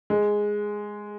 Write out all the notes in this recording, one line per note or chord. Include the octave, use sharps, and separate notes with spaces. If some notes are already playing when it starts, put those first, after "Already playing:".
G#3